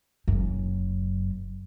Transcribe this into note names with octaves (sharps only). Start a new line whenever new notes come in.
F#1 F#2